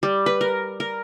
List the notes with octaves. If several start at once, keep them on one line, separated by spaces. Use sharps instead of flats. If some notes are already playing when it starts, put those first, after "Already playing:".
G3
B4
A#4
A#4